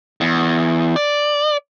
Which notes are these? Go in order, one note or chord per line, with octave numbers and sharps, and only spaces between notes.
E2
D5